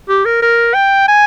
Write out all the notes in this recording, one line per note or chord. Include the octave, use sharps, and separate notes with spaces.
G4
A#4
A#4
G5
G#5